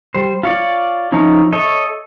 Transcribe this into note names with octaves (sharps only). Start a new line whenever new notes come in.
G3 C5
F4 C#5 D5
F3 C#4 D#4 E4
A4 C#5 D#5 E5